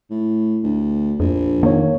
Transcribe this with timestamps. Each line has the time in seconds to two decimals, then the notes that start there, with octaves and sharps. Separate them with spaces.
0.10 A2
0.64 D2
1.20 A#1 F2
1.63 D#3 A#3 C#5